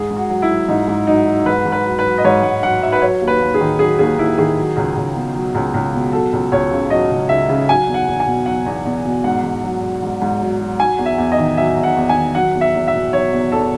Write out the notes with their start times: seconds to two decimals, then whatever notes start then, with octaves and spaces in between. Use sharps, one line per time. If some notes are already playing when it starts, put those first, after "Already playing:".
Already playing: G#2 G#4
0.10 G#2
0.17 F#4
0.30 F#3
0.42 E4
0.49 F#3
0.68 G#2 D#4
0.88 G#2
1.07 F#3 D#4
1.26 F#3
1.46 G#2 B4
1.66 G#2
1.72 B4
1.85 F#3
1.99 B4
2.05 F#3
2.18 D#5
2.24 G#2 C#5
2.43 G#2 F#5
2.63 F#3 F#5
2.82 F#3 E5
2.92 B4
3.01 F#3 C#5
3.21 D#2
3.28 B4
3.40 D#2
3.54 G#4
3.60 D#3
3.79 F#3 G#4
3.99 D#2 G#4
4.18 D#2 E4
4.38 D#3 G#4
4.58 F#3
4.77 C#2
4.96 C#2
5.15 B2
5.35 F#3
5.55 C#2
5.74 C#2
5.93 B2
6.12 F#3 A4
6.33 C#2
6.52 C#2 C#5
6.71 C#3
6.90 F#3 D#5
7.11 C#2
7.29 C#2 E5
7.48 C#3
7.68 F#3 G#5
7.87 E2
7.94 F#5
8.07 E2
8.20 G#5
8.26 B2
8.46 F#3 F#5
8.66 E2
8.85 E2
9.05 B2
9.24 G#2 F#5
9.44 G#2
9.63 F#3
9.82 F#3
10.02 G#2
10.22 G#2
10.41 F#3
10.60 F#3
10.79 F#3 G#5
10.98 E2
11.06 E5
11.18 E2
11.32 D#5
11.38 D#3
11.57 F#3 E5
11.77 E2
11.83 F#5
11.96 E2
12.09 G#5
12.15 D#3
12.35 F#3 F#5
12.55 E2
12.61 E5
12.75 E2
12.88 E5
12.94 B2
13.13 F#3 C#5
13.32 E2
13.52 E2 A4